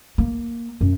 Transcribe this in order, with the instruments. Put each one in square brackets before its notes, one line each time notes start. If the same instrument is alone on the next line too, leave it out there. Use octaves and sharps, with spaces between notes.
[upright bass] A#3
F#2